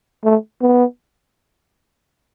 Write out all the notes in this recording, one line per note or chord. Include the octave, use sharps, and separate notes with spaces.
A3
B3